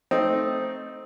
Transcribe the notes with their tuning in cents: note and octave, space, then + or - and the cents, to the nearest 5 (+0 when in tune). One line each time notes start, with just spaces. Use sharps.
A3 +0 C4 +0 D#4 +0